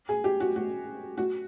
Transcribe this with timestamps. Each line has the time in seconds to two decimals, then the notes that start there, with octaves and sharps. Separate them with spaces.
0.09 G#4
0.24 G4
0.40 F#4
0.56 F#4
1.17 F#4